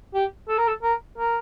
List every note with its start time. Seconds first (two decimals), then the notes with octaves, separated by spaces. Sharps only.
0.14 G4
0.49 A4
0.58 A#4
0.68 A4
0.83 A#4
1.18 A#4